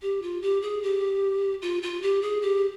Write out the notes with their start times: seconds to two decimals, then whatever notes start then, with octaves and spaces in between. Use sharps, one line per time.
0.02 G4
0.22 F4
0.42 G4
0.62 G#4
0.83 G4
1.62 F4
1.82 F4
2.02 G4
2.22 G#4
2.42 G4